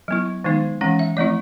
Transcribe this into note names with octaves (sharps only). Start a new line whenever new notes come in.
F#3 B3 E4
D#3 G#3 B3 D#4
E3 G#3 C#4 F#5
E5
F3 A3 C4 E4 D#5